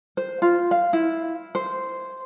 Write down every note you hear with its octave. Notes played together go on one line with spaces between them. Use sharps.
C5
F4
F5
E4
C5